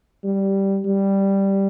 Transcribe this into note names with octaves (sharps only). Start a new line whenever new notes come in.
G3
G3